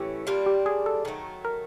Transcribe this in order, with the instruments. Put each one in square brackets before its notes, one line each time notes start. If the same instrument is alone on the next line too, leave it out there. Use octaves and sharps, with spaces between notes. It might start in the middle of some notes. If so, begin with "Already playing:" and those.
Already playing: [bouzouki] A2 E3 A3 C#4 [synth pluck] G4
[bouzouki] G3 A#3 D4 F4
[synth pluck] G4
G#4
A4
[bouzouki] D#3 F#3 A3
[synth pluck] A#4